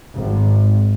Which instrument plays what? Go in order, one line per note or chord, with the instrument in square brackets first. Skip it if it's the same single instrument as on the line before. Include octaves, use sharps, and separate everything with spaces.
[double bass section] G#1